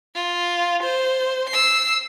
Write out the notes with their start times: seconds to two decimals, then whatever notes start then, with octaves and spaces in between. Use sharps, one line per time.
0.15 F4
0.82 C5
1.49 E6 C7